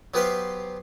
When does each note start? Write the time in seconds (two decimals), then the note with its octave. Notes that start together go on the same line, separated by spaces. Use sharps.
0.14 F#3 B3 G4 B4 C5 F5